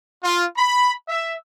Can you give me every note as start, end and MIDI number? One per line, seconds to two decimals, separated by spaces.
0.23 0.45 65
0.56 0.93 83
1.09 1.35 76